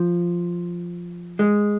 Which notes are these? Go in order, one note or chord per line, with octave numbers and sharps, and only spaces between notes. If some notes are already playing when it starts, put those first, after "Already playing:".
Already playing: F3
G#3